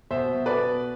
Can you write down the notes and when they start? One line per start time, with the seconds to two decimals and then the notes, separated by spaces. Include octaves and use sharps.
0.11 B2 C5 E5
0.34 B2
0.46 B4 D5
0.58 B2